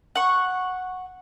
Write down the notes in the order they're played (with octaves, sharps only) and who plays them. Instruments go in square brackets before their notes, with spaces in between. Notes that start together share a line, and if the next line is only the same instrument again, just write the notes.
[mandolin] F#5 C#6